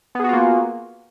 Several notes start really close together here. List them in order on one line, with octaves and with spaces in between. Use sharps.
B3 G#4 F#4 F4 A#3